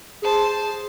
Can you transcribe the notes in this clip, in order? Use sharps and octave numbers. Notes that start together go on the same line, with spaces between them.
G#4 C5 A5